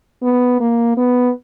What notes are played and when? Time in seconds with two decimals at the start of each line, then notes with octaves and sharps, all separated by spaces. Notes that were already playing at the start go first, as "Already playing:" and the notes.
0.23 B3
0.60 A#3
0.97 B3